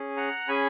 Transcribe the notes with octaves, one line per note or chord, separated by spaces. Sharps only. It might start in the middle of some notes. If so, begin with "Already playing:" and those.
Already playing: C#4 G#4
F#5 A#5
C#4 G#4 G#5 B5